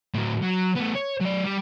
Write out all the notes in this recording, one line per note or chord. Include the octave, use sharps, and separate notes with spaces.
A2 F#3
F#3
A3 B3
C#5
F#3 D5
G3